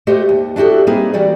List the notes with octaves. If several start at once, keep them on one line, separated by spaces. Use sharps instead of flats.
A3 F#4 G4 C5 D#5
D#2
D4 E4 F#4 G4 A4
G3 A#3 C4 D#4 G#4 B4
E3 G3 F#4 G4 D5